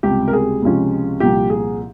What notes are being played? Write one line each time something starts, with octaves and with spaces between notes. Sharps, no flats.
C#2 C3 G3 C4 G4
A#4
G#4
C#2 C3 F3 G#3 C#4
C2 A#2 F3 G4
G#4